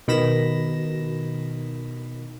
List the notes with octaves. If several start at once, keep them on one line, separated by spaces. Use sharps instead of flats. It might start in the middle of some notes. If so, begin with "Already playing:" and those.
B2 D#3 B5 A#6 E7